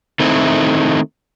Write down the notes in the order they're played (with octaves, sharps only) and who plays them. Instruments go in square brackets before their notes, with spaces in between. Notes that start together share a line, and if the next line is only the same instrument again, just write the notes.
[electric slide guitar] D#3 A3 C4 D#4 E4